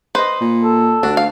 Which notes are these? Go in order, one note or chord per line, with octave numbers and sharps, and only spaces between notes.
B4 C5 D#5
A#2
A4
D2 D4 F#4
F5